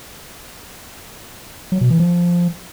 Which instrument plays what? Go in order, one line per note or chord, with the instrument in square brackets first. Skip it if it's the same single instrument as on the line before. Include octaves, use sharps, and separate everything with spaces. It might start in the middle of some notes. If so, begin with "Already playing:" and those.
[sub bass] F#3
B2
E3
F3